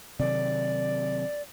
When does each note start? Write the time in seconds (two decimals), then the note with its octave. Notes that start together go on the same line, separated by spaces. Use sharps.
0.19 C3 D#3 F#3 D5